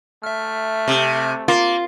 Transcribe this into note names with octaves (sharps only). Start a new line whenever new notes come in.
A3 E5 F6
C3
A#3 F4